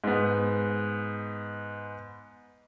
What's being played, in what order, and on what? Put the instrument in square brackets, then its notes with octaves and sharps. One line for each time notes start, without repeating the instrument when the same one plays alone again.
[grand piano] G#2 B3